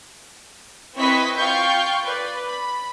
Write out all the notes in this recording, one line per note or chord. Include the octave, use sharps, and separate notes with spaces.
C4 E4 B4 D#5 C#6 B6
F4 F5 G5 C#6 G6
B4 D5
B5